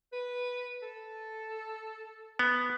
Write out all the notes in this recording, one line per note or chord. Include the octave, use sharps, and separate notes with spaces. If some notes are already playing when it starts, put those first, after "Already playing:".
B4
A4
B3